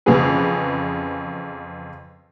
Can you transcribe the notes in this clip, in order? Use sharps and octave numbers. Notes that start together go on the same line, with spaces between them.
F2 C#3 E3 C#4 G#4 B4